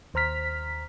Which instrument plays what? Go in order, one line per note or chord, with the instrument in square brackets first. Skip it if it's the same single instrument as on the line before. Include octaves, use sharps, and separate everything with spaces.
[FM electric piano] D#2 C5 A#5 F6 B6